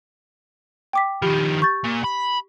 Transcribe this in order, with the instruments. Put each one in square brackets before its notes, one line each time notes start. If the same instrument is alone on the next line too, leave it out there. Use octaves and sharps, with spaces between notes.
[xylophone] G5 D6 B6
[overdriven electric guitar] D#3 F3 [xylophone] G4 B5
[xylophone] C#6 G6 A6
[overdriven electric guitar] A#2
B5